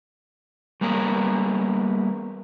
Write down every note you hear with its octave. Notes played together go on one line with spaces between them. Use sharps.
G3 A#3 B3 G#4 A#4